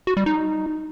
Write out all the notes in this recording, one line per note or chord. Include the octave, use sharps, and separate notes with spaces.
F#4
G3
D#4